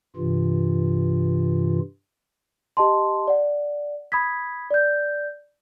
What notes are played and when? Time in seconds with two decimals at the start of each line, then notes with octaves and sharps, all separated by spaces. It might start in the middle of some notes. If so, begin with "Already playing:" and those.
0.16 G2 C3 E3 F4
2.77 G4 D#5 A5 C6
3.28 D5 F#5
4.12 B5 D#6 G#6 B6
4.71 D5 G6